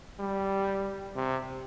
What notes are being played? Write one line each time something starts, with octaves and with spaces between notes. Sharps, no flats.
G3
C3